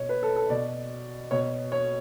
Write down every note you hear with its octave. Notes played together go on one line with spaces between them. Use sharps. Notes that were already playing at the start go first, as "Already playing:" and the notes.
Already playing: B2 C#5
B4
A4
A4
B2 D5
B2 C#5
C#5